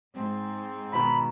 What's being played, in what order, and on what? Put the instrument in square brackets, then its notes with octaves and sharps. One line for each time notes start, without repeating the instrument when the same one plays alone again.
[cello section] G#2 [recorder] C4
[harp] B2 D#3 [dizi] B5